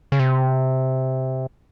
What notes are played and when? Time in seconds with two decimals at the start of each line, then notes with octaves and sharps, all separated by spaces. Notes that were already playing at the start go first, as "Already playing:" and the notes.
0.12 C#3
0.19 C3